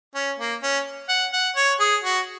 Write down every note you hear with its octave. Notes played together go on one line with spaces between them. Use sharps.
C#4
A#3
C#4
F#5
F#5
C#5
G#4
F#4